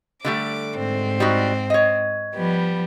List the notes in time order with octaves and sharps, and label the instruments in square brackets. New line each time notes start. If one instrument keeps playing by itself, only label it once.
[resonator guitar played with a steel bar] D3 G3 A3 [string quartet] D6
[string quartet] G#2 C4
[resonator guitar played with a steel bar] G3 D#4 F#4
C#5 D#5
[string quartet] F3 G3 B3